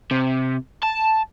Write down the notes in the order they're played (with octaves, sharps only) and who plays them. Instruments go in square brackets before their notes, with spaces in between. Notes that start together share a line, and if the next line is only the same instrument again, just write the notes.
[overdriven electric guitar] C3
A5